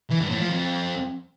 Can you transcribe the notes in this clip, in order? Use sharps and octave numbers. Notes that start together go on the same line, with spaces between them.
E3
G2
A2
F3
F2